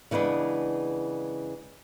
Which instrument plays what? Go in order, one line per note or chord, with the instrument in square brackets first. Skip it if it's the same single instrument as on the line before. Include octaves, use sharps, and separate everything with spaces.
[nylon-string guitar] C#3 E3 G#3 B3 D4